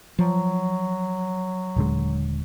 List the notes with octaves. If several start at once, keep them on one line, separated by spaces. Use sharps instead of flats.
F3 F#3
D#1 D3 G#3